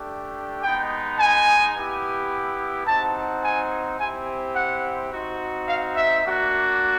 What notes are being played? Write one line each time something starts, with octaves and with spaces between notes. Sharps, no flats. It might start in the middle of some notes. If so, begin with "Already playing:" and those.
Already playing: A3 D4 G4
G#3 B3 D#4 G5
G#5
B3 E4 G4
C4 D#4 F#4 A5
G#5
C4 E4 G4 G#5
F#5
C4 D#4 F#4
F5
E5
A#3 D4 F#4